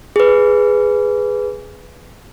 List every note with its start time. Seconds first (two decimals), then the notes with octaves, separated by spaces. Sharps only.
0.16 G#4 B4